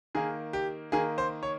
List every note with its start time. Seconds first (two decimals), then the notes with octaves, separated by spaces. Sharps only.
0.15 D#3 A#3 G#4
0.53 G4
0.92 D#3 A#3 G#4
1.18 C5
1.43 C#5